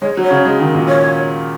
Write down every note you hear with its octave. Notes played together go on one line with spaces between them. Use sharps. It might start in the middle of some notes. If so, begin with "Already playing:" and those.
G#3 C#5
F#3
C#5
C#3
G#3
D#3
A#2
C#5